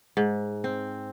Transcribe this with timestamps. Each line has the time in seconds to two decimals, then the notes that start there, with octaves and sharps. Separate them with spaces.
0.17 G#2
0.64 C4